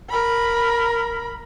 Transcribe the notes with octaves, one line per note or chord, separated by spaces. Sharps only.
A#4 B5